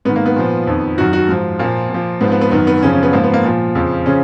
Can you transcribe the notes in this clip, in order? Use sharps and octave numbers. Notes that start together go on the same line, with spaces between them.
G#2 D#3 B3
A#3
B3
A#2 F3
F2 D#3
F#2 D#3 F#4
F#4
G#2 F3
A#2 F3 A#3
A#2 F3
G#2 F3 B3
B3
B3
F#2 D#3 B3
B3
F#2 C#3 F3 C#4
C#4
B3
G#2 F3 A#3
B3
A#3
A#2 F3
F2 C#3 F3
C#3 F3 C#4